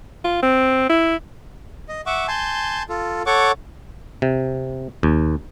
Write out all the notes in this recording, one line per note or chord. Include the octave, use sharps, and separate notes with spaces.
F4
C4
E4
D#5
E5 F#5 C#6 D6
G#5 A5 C6 G6
F4 A4
A4 C#5 F#5 C#6 D6
C3
D#2